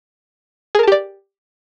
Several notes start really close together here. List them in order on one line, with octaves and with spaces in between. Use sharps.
G#4 A#4 A5 G4 D5